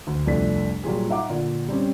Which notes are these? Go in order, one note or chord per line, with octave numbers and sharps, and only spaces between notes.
D2
C2 F2 A3 D4 B6
A#2 F#3 G3 F4 G#4
D#4 E5 F#5 D6
A#2 D3
G3 C4 C#4